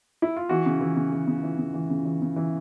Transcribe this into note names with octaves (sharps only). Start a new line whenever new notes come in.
E4
F4
E3 F#4
C#3
E3
C#3
E3
C#3
E3
C#3
E3
C#3
E3
C#3
E3